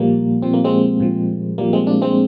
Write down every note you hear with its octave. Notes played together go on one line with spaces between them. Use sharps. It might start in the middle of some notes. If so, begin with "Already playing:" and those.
Already playing: A#2 F3 G3 A#3
A#2 F3 C4
A#3
G#3 C4
A#2 F3
A#2 F3 G3 A#3
G#3 C4
A#3 D4
G#3 C4